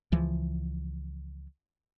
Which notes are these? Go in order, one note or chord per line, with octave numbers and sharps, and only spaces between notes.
C#2 E3 F3